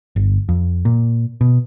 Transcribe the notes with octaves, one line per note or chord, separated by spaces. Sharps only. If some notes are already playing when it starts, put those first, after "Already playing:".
G1
F2
A#2
B2